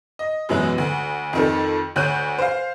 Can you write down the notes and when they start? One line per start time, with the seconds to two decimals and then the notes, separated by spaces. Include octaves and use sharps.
0.19 D#5
0.49 F#2 B2 E3 F#3 G#3 B3
0.78 D2
1.33 F2 D#3 A4
1.96 D2 C#5 F#6 G6 D#7
2.38 C5 F5